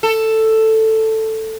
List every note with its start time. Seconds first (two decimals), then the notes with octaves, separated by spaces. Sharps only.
0.03 A4